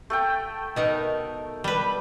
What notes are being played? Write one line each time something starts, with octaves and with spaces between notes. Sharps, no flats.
A3 A4 G5
B2 D#4 A#4
G3 B4